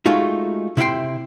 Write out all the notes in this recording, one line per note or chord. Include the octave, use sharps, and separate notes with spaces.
G#3 A3 D#4 F4 F#4
C3 E4 F5 G5 C6